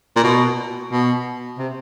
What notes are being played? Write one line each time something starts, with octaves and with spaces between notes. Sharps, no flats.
A#2
B2
B2
C3